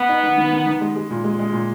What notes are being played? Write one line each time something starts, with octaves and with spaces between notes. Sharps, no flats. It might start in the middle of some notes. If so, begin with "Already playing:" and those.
Already playing: B3
D#4
D#3
D#3
D#3
D#3
G#3
G#3
A#2
G#3
G#3
A#2